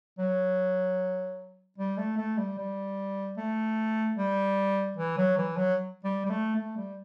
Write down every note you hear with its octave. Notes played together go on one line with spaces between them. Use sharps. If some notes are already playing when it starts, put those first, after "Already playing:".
F#3
G3
A3
A3
G3
G3
A3
G3
E3
F#3
E3
F#3
G3
G3
A3
A3
G3